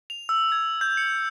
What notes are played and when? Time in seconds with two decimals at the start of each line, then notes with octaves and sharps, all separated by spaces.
0.10 F7
0.29 E6
0.52 G#6
0.81 G6
0.97 C#7